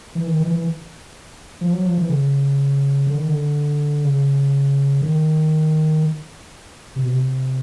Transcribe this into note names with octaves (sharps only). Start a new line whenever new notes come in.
E3
D#3
E3
E3
F3
F#3
F3
E3
C#3
D3
D#3
D3
C#3
D#3
C3
B2
C3